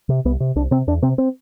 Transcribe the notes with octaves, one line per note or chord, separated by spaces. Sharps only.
C3
C2 B3
C3
C2 D4
C3 C4
E2 D4
C3 C4
C4